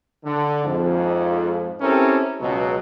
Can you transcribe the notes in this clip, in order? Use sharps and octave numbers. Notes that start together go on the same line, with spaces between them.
D3
F2 G#2 F3
C4 C#4 E4 G4 A4 A#4
C#2 B2 F#3